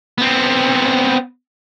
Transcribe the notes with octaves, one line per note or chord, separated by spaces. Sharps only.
B3 C4